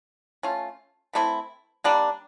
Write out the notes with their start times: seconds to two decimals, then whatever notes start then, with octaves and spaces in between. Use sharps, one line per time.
0.43 A3 C#4 F4
1.13 E3 A3 C4 E4
1.84 G3 A#3 D4